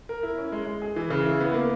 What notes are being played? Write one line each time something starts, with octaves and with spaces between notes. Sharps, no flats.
A#4
E4
C#4
G#3
G#3
G#4
E3
C#3
E4
B3
A#3